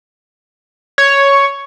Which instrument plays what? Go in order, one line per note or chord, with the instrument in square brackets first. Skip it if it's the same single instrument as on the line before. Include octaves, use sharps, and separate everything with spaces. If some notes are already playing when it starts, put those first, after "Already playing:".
[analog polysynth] C#5